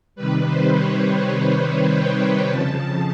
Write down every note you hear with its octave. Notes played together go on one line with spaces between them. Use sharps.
C3 D#3 G3 B4
C5
C#5
G5
F2 C#3 F3 A5